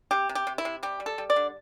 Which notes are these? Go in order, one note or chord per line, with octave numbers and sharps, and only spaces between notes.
C3 G4
C3
G4
C3
E4
C3
G3 G4
G3
A4
G3
D5
D3